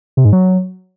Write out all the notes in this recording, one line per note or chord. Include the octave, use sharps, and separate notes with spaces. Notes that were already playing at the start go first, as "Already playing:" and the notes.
C3
G#2
F#3